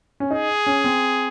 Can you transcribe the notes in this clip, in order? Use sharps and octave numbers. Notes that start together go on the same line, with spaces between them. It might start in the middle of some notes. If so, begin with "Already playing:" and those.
C#4
D#4 G#4
C#4
C4